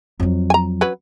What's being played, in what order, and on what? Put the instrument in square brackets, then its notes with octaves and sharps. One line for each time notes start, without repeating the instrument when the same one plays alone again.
[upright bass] F2 F#3
[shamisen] G#5 A#5
F#3 C#4 B4